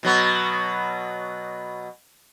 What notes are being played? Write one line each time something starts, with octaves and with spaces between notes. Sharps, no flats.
B2 F#3 B3